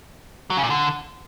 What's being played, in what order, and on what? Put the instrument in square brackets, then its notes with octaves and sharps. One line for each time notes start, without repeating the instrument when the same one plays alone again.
[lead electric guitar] F#3
C#3
A#2
D3